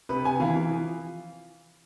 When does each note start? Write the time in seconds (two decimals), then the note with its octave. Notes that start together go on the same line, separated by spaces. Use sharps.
0.09 C3 B4
0.24 C3 G#5
0.40 E3 F5
0.56 E3
0.71 F3